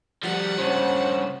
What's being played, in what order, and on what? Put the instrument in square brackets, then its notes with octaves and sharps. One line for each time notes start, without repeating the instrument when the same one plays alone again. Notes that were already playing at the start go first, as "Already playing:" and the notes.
[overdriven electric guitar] F3 G3 [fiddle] F#5
[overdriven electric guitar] G2 C#3 [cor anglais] C5 [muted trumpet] C#5